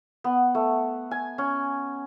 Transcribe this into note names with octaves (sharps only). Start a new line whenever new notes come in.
B3
A3
G#5
C#4